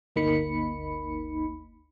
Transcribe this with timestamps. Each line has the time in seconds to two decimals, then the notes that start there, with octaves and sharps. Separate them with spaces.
0.16 G1 D2 A#3 D#4 B5 C#7